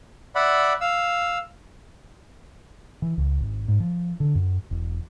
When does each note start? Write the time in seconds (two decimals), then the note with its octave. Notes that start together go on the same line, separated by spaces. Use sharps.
0.35 D5 E5 F#5 B5
0.81 F5 E6
3.02 E3
3.18 C#2
3.40 G#1
3.68 G#2
3.80 F3
4.20 D3
4.35 F#2
4.71 E1